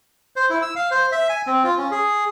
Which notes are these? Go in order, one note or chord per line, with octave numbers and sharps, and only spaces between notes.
C5
E4
E6
F5
C5
E5
G#5
C4
F4
C#4
G#4